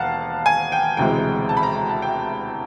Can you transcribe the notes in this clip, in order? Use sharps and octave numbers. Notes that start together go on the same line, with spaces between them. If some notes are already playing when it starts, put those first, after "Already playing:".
Already playing: E1 D#2 F5 F#5 A5
G#5
G5
E1 D2 C3 E3 G#3 G5
A5
B5
A#5
A#5
A5
G5